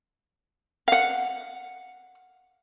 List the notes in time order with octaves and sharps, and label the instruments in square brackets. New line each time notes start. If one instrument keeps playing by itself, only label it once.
[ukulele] F5 F#5